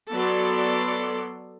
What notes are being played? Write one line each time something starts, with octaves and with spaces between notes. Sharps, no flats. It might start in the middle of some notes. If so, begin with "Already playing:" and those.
F#3 B3 A4 D5 C6